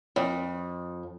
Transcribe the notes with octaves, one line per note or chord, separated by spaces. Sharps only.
F2